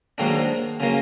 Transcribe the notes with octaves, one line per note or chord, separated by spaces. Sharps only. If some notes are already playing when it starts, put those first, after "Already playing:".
G#2 D#3 F#3 A#3 D4
C#3 F#3 A#3